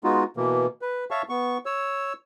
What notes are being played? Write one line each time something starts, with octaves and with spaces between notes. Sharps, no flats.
G#3 B3 D#4 F4 F#4
B2 E3 A#3
B4
C#5 E5 F5 A5 C#6
B3 C#6
C#5 E6